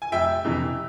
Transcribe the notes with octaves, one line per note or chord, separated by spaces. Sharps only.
G#5
F1 E5 G5
F2 C3 E3